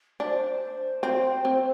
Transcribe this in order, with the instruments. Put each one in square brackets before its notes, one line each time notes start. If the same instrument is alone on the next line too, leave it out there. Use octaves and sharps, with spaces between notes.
[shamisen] D4 [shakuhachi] C5
[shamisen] C4
C4